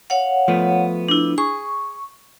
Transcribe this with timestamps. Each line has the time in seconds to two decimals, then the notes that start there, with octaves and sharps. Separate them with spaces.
0.10 C#5 F5 F#5
0.48 F3 A3 B3
1.08 D4 E4
1.38 G#4 C#6